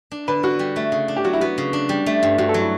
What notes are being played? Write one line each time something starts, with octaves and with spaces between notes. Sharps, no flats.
D4
D3 B4
D3 F#4
G3
A3
C#3
D4
G4
F#3 F#4
E4
B3 F#4
C#3
D4
G3
A3
G2
G2 F#4
A4
F#3
E4